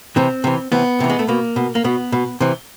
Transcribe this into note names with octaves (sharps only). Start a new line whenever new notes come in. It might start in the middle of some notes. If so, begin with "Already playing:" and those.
C3 E3 C4
C3 E3
C3 E3 B3
C3 E3
G#3
A3
B2 A#3
B2
A#3
B2 B3
B2
C3 E3